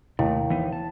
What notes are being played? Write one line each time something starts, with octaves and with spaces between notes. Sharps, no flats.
D#2 C3 A3 E4
E3 B3 D#4
A5